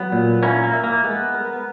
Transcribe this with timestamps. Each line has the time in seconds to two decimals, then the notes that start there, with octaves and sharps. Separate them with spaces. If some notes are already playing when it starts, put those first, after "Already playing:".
Already playing: F#3 B3
0.12 A#2
0.43 A#3 C#4 E4
0.64 A#3
0.74 E5
0.84 A#3
1.04 G#3 B3
1.34 A#4